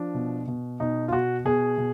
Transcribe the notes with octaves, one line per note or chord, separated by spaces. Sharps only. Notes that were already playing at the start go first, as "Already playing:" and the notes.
Already playing: F3 D4
B2
B2
B2 D#4
F4
B2 F#4
B2 G#4
B2